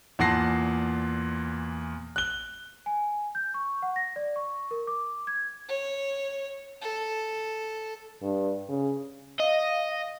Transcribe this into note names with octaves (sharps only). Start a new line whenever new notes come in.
E2 A#2 F#5 A5 A#6 C7
F#6 G7
G#5
G6
C#6
F#5
A#6
D5
C#6
A#4
D6
G#6
C#5
A4
G2
C#3
D#5 F5